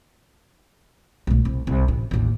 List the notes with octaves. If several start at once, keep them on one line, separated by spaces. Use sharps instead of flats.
B1 A3
C2
C2
A1 E3
A1 D#2